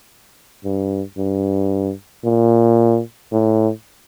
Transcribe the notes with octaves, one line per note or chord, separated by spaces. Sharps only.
G2
G2
A#2
A2